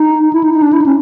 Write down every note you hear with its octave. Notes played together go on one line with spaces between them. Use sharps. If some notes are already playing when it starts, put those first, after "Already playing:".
Already playing: D#4
E4
D#4
D#4
D4
E4
D#4
C#4